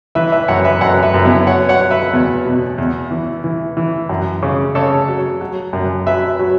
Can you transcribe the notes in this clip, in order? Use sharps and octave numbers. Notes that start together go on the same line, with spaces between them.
E3 B4 E5
B4 E5
F#2 C#5 F#5
B4 E5
F#2 C#5 F#5
B4 E5
F#2
B3 E4
F#3 C#5 F#5
C#5 F#5
F#3
B4 E5
E2
B2
E2
E3
E3
E3
F#2
C#3
C#3 A4 C#5
F#3
F#3
F#2
F#3 B4 E5
F#3